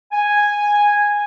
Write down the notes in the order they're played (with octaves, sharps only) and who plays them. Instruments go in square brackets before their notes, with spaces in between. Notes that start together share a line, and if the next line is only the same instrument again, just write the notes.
[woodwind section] G#5